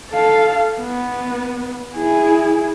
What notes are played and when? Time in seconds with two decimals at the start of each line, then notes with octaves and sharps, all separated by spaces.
0.11 A4 F5
0.79 B3
1.96 E4 G#4